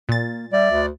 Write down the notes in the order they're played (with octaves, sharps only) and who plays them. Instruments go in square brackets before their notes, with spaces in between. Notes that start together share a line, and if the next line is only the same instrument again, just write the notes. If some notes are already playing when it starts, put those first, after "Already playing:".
[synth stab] A#2 A6 [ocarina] A#3
[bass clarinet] G3 [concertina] D5 [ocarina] E5
[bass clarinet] D2